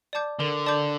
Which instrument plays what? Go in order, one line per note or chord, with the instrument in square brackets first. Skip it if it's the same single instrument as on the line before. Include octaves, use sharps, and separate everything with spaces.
[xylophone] D5 A5 D6 G6
[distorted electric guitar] D3 [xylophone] A#4
[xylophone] D5 A5 D6 G6